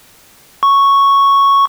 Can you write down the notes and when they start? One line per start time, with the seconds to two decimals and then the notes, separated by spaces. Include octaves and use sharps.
0.63 C#6